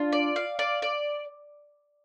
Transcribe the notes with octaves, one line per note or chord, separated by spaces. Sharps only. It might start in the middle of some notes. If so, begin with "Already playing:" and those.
Already playing: D4 F4
D5
F5
D5
D5